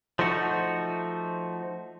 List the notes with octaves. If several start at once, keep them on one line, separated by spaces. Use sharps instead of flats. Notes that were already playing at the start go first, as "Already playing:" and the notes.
F3 A3 D#4 F#4